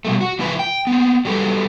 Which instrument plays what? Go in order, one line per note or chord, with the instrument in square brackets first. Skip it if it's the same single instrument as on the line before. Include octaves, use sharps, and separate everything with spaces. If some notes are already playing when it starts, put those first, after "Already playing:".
[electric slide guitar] B2 G3 A3
F#4
A2 C#3 F3 E4 F4 B4
G5
B3 C4
F#3 G3 G4 A4 B4